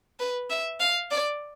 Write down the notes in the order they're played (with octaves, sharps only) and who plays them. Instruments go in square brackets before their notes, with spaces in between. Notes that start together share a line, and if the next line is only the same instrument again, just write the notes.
[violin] B4
E5
F5
D5